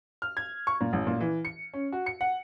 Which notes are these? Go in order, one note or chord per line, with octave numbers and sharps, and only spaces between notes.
F6
G#6
C#6
A#2
A1
A#2
E3
C#7
C#4
F#4
C#7
F#5